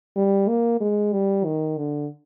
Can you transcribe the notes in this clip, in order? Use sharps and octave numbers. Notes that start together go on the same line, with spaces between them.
G3
A#3
G#3
G3
D#3
D3